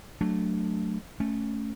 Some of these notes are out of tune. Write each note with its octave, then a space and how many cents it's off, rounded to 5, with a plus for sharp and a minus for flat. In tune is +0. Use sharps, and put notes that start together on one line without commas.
F#3 +0 A3 +0 D4 +0
A3 +0 C#4 +0